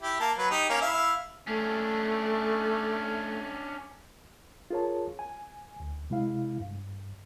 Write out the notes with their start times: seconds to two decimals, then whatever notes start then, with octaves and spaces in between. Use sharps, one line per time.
0.01 E4 G4
0.20 A#3 A5
0.38 F#3 B4
0.51 D#4 G4
0.69 A#3 C#4
0.81 E4 E5 F5
1.47 A3 C#4 D4
4.71 F4 G#4 A#4 C#5 A5
5.19 G#5
5.80 D2
6.10 C3 G#3 E4 F5
6.60 G2